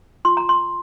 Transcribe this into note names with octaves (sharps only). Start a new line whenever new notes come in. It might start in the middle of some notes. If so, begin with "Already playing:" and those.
F4 C6
A#5
C6